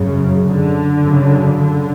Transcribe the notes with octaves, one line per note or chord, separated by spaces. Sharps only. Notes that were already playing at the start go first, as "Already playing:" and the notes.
Already playing: F#2 C#3
D3
F#2 C#3
D3